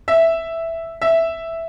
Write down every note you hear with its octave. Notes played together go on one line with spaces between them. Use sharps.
E5
E5